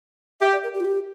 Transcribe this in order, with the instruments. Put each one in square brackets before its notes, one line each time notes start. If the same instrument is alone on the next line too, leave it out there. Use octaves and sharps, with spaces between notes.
[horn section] G4 [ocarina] E5
[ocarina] D5
A#4
G4
F4
G4